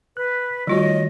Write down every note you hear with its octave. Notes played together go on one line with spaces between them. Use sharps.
B4 F#6
D#3 G3 A3 F4 F#4 C#5 D#5